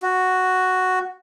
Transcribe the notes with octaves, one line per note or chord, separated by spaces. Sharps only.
F#4